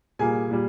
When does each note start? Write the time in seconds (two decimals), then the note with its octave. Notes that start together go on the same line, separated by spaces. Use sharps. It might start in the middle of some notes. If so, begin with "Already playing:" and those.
0.19 A#2 G3 A#3 G#4 G#5
0.51 A#2 G3